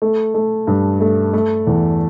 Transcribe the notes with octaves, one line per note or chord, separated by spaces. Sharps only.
A3
A3
G2
A3
A3
E2